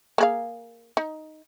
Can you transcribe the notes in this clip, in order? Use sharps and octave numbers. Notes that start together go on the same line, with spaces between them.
A#3 G#4 F5
D#4